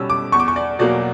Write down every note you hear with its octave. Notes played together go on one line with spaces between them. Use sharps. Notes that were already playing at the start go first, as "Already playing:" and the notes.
Already playing: B2 G3 C#4 E6
D6
E2 C#6
D6
C#6
D5
B2 F#3 A#3 D5